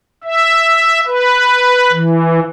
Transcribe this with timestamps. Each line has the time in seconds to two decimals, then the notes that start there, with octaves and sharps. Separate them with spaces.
0.24 E5
1.07 B4
1.92 E3